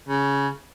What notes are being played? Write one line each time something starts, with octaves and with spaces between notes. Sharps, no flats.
C#3